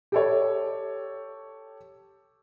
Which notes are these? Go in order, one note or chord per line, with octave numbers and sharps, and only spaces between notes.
G4 A4 C#5